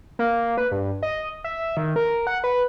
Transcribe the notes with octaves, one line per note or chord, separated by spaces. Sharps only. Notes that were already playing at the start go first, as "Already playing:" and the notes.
A#3
B4
G2
D#5
E5
D#3
A#4
F#5
B4